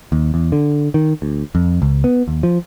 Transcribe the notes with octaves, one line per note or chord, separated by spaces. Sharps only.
D#2
E2
D3
D#3
D2
F2
C#2
B3
D#2
F3